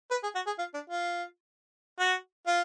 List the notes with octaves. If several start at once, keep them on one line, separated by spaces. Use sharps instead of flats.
B4
G#4
F#4
G#4
F4
D4
F4
F#4
F4